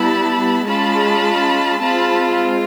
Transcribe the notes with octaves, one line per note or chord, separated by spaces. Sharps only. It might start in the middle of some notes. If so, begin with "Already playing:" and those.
Already playing: G3 B3 E4 A5 B5
G#3 C#4 F4 A5 B5
G#3 C4 F4 A5 B5